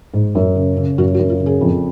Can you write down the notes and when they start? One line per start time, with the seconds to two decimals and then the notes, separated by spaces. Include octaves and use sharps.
0.14 G#2
0.35 F#2
0.55 C#3
0.77 C#3
0.98 F#2 F#4
1.14 F#4
1.19 F#2
1.30 F4
1.40 C#3
1.46 G#4
1.61 F2